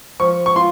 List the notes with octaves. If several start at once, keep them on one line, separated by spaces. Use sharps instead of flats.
F3 C#6
C#6
F4 C6